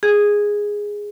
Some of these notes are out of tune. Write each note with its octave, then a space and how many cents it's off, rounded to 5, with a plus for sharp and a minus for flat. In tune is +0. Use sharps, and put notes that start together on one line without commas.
G#4 -5